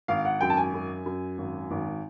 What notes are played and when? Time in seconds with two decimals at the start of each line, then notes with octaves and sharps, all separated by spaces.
0.08 G#1 F5
0.25 F#5
0.41 F#2 G5
0.50 A5
0.57 G#5
0.74 F#2
1.06 F#2
1.38 G#1
1.71 G#1